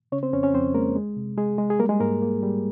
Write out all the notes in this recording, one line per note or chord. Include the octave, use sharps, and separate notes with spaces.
C#3 C#4 C#5
C4 C5
F2 C#4 C#5
C#4 C#5
F2 C4 C5
G#3 A#3 A#4
G#3
C3
G#3 G#4
G#3
G#4
G3 A#3 A#4
G#3 G#4
G#2 A#3 A#4
A#3
G3